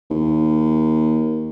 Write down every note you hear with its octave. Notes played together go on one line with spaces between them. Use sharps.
D#2